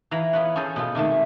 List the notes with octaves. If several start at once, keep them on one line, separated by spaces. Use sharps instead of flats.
E3 F5 A#5 B5
B3 F4 B4 C#5 F#5
C#4 G#4 A4 C5
B2 B3 F4 A4
C3 D#3 G#3 A3